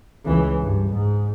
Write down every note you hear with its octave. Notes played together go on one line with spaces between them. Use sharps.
C#2 E3
G2
G#2